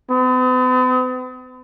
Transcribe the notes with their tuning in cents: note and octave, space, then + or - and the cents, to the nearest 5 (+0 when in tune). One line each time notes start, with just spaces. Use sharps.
B3 +45